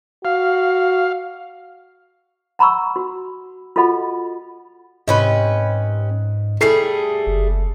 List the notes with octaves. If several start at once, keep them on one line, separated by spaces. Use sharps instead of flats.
F#4 F5
F#5 A#5 B5 C#6 E6
F#4
F4 F#4 A4 D#5 F#5 B5
G#2 C3 C#4 B4 D#5
G3 A3 G#4 A4 C7
F#1